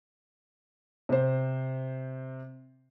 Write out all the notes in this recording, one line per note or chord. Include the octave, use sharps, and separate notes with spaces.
C3 C5